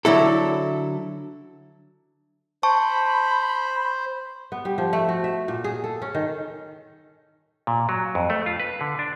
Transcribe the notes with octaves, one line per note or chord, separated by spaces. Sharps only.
D3 F#3 E4 A4
C5 A5 B5 C#6
B3
G3
F3
A3
F#4
E5
A#2
G#4
A4
C#4
D#3
A#2
F#3
F2
A3
F4
B4
D3
D4